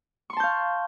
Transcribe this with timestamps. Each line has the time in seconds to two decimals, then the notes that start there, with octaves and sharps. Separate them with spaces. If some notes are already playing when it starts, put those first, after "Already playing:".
0.30 C#6
0.33 C6
0.37 A5
0.40 G6
0.43 F5